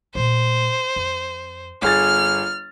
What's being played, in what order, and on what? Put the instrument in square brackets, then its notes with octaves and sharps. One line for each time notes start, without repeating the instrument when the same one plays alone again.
[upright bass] A#2 A3 [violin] C5
[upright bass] F2
[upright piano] G1 G#4 A6 [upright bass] B3 [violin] F6